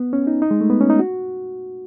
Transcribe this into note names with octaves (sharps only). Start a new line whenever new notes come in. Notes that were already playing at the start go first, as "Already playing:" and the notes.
Already playing: B3
C#4
D#4
D#4
G#3
A3
B3
C#4
D#4
F#4